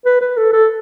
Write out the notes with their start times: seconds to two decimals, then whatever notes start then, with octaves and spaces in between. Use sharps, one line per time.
0.05 B4
0.21 B4
0.37 A4
0.53 A4